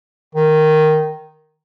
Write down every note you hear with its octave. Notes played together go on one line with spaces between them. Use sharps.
D#3